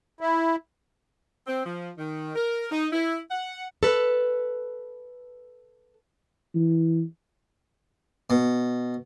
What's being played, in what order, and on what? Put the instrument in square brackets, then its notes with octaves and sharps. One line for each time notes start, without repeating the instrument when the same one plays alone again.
[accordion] E4
[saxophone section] C4
F3
D#3
A#4
D#4
E4
F#5
[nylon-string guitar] A4 B4
[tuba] E3
[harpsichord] B2